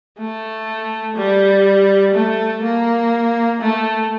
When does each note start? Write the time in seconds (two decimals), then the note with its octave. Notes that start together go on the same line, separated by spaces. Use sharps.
0.19 A3
1.16 G3
2.14 A3
2.63 A#3
3.60 A3